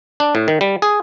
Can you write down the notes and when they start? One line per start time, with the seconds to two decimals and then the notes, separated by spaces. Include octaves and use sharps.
0.20 D4
0.35 A2
0.48 D#3
0.61 G3
0.82 G#4